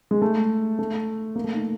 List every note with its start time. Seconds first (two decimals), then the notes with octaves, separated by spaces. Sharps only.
0.11 G#3
0.22 A3
0.79 A3
1.36 A#3
1.44 A3
1.54 D#4